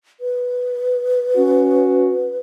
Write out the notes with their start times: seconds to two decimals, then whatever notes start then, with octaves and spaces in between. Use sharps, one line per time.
0.20 B4
1.36 C#4 F#4